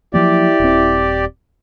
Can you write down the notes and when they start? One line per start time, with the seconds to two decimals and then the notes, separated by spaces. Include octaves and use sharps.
0.14 F3 F#3 A#3 E4 G4 D5
0.60 D#1 C4